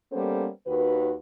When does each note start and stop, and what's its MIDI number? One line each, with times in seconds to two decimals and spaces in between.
0.12 0.48 55
0.12 0.48 58
0.12 0.48 59
0.12 0.48 61
0.12 0.48 69
0.12 0.48 72
0.67 1.14 39
0.67 1.14 51
0.67 1.14 66
0.67 1.14 71